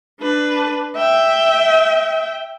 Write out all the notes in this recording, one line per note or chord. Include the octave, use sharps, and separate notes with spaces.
D4 B4
E5 G5